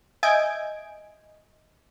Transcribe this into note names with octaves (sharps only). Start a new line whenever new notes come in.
D#5 E5 G#5 G6 G#6 D7